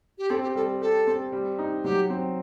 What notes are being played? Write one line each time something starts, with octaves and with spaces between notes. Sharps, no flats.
G4
C4 A4
G4
G3 A4
G4 A4
C4
G3
D#4
F#3 G4
C4